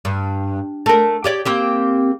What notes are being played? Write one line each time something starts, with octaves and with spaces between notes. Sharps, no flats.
G2
A3 A#4
G4 C#5 D5
A#3 C4 G4